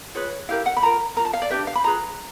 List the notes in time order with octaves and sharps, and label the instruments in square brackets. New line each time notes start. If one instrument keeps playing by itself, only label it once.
[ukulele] F4 G#4 B4 C#5
E4 G4 A#4 F5
F#5
B5
F4 A#4 A#5
A#4 A#5
F4
A5
F5
D5
D4 G4 B4 E5
F5
B5
F4 G#4 B4 A#5